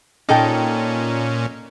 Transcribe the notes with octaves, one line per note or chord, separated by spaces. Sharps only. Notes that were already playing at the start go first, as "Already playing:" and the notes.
A#2 C#4 D#4 A4 G5